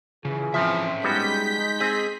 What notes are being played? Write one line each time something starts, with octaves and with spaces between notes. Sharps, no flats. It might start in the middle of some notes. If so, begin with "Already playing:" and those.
C#3 E3 F4 G#4
F3 C4 C#4 B4 E5 A#5
G3 G#3 B3 D#4 F#4 G6 B6
C4 G#4